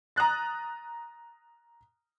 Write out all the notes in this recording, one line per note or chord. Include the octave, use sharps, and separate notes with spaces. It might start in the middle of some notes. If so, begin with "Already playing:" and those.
A#5 D#6 F#6 A6